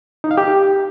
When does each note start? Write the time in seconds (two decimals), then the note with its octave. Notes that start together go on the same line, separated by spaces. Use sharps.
0.24 D#4
0.31 F5
0.38 G4